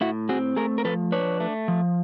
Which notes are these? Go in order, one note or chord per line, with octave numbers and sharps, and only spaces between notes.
A2 E4 F#4
C4 F#4 G#4
A3 G#4 A#4
A#4
F3 A4 B4
D4 B4 C#5
A3
F3